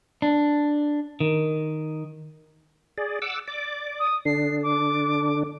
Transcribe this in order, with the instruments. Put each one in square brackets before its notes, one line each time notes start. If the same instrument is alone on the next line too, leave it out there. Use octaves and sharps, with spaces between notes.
[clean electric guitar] D4
D#3
[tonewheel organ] G#4 D5
F#5 D6 E6
D5 D6
[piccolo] D#6
[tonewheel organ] D3 D4 [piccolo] C7
[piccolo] D6